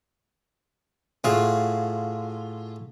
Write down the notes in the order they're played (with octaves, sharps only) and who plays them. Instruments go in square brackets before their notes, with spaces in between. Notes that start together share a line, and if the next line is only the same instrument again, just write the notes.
[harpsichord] A2 F#4 G#4 [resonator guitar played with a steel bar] F4